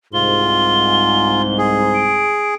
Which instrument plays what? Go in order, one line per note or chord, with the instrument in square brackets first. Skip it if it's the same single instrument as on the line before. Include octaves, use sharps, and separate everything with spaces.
[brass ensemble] C2 G#2 [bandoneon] F4 [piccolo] G7
[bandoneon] G#4
[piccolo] D7